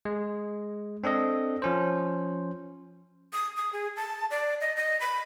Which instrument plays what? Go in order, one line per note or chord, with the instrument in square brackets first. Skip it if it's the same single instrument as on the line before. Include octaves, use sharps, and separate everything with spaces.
[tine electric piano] G#3
C4 D4 A4 D#5
F3 C#4 C5
[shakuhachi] D#6
D#6
G#4
A5
D5
D#5
D#5
B5